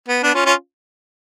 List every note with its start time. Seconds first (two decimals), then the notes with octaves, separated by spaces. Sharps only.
0.08 B3
0.23 B3 D4
0.34 C#4 F4
0.45 C#4 F4